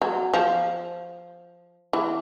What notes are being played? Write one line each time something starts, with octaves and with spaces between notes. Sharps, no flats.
F#3
F3
E3